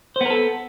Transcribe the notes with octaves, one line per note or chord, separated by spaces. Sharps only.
B3 A4 A#4 C5